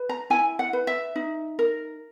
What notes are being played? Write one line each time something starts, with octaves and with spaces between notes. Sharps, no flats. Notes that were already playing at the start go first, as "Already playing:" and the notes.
Already playing: B4
A#5
E4 G#5
F#5
B4
E5
D#4
A#4